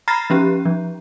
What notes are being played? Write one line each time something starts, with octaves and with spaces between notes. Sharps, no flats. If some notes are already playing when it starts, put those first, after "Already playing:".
A#5 B5 F6 A6 A#6 C7
F3 C#4 G4
F3